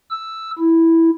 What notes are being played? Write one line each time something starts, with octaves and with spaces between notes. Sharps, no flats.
E6
E4